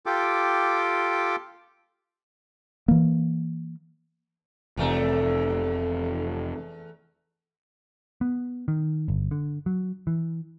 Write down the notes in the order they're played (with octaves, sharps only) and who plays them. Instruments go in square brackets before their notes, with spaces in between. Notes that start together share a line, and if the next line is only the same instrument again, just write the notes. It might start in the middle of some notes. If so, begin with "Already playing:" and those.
[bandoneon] F4 G4 A4 G5 D6
[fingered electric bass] E3 A#3
[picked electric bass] F1 C3 [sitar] E2 A3
[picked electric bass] B3
D#3
G1
D3
F#3
E3